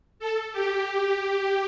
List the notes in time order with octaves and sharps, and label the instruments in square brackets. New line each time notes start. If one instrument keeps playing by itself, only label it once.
[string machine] A4
G4